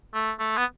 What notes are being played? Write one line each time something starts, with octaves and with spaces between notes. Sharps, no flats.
A3
A3
B3